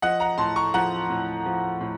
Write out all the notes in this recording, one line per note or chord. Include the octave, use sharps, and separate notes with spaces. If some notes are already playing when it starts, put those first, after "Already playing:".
F3 D#5 F#5
F#5 A#5
A2 A5 C6
A#5 C#6
F3 F#5 A#5
A2
F3
A2